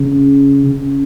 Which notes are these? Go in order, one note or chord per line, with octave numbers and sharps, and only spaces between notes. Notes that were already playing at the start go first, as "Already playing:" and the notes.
Already playing: C#3
C#3